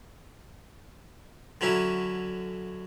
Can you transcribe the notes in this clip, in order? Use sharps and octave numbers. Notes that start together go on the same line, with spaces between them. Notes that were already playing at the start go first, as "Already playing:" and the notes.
D3 F#3 C#4 E4